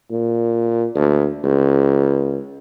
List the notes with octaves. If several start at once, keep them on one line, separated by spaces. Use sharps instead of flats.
A#2
D2
C#2